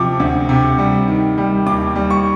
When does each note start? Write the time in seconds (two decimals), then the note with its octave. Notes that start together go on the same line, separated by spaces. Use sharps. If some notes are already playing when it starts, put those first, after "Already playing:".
Already playing: C3 F3 D6
0.20 D2
0.49 C3
0.78 G3
1.08 D#3
1.38 G3
1.66 D#2 D6
1.96 G3
2.10 C#6